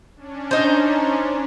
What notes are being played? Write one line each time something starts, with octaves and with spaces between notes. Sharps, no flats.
C#4 D4
D#4 C5